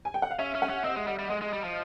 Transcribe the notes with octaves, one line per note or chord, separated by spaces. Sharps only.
G#5
G5
F#5
F5
C#4 E5
C#4
F#5
C#4
C4 D#5
G#3
G3 D#5
G3
G#3 D#5
G#3
G3
F3